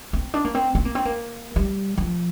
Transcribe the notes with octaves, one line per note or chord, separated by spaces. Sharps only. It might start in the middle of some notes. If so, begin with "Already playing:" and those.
C4
D4
A#3
C4
C4
A#3
C4
A#3
G3
F3